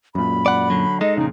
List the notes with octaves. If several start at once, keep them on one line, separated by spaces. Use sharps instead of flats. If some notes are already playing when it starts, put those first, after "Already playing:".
F#2 A#2 B5
D5 F#5
D3 F#3
G#3 D#4 A4 D#5
F2 A#2 C#3 D#4